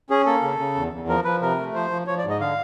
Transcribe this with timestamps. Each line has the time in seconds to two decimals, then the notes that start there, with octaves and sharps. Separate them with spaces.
0.10 C#4 G#4
0.26 A#3 A4
0.42 C#3
0.59 C#3
0.76 E2
0.93 E2
1.08 F3 A#4
1.25 F3 B4
1.42 C3 A#4
1.59 A3
1.74 F3 C5
1.91 F3
2.07 F3 C#5
2.18 D5
2.24 G#2
2.30 D#5
2.40 D3 F5